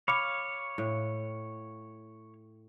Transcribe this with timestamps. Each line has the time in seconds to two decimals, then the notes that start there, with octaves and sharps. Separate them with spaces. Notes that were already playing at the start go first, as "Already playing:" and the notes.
0.08 C#5 F5 B5 D6 C#7
0.78 A2